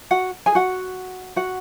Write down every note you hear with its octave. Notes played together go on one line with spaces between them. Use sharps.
F#4 F#5
G#4 G#5
F#4 F#5
F#4 F#5